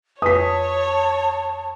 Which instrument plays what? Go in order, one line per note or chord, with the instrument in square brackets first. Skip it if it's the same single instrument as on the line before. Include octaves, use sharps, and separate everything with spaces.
[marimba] F2 B4 [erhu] C#5 [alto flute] A5 [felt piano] D#6 B6